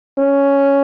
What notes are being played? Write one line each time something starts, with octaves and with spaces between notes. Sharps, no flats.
C#4